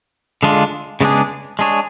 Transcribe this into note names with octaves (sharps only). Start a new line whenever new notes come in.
D3 G#3 D4 F4
C#3 G#3 B3 D4 G#4
G#3 D4 G#4 C#5